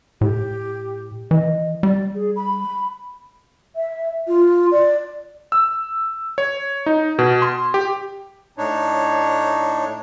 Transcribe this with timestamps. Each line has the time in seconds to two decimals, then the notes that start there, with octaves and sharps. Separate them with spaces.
0.21 A2 G4
1.31 E3 D#5
1.83 G3 D5
2.15 G#4
2.36 B5
3.76 E5
4.28 F4
4.72 D5
5.52 E6
6.38 C#5
6.86 D#4
7.19 B2
7.42 C6
7.74 G4
8.58 A2 D4 D#4 C#5